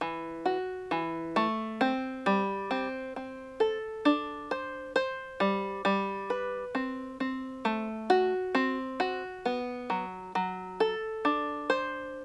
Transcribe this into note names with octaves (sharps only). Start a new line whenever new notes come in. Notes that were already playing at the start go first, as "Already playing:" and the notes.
E3
F#4
E3
A3
C4
G3
C4
C4
A4
D4
C5
C5
G3
G3
B4
C4
C4
A3
F#4
C4
F#4
B3
F#3
F#3
A4
D4
C5